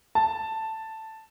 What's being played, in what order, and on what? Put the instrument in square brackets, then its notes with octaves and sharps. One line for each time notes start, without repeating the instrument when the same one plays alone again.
[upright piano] A5